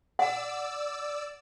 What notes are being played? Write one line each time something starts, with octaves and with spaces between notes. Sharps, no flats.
D5 F#5 E6